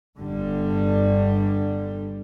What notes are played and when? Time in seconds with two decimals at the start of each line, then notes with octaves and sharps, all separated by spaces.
0.18 G1 D3 G3